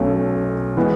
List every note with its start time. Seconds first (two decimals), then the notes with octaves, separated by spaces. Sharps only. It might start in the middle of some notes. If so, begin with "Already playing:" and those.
Already playing: B1 B2 A3 C#4
0.77 E3 G#3 B3